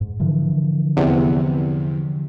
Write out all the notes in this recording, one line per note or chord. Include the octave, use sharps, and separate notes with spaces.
G#2
D3 E3 F3
E2 C3